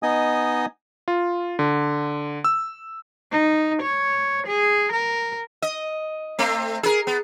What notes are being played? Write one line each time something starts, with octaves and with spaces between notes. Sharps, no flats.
B3 D#4 D#5 G#5 D#6
F4
D3
E6
D#4
C#5
G#4
A#4
D#5
A3 C4
G#4 A#4
B3